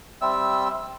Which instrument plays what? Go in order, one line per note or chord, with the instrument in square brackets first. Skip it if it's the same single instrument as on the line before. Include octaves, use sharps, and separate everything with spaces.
[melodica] G3 C4 E5 E6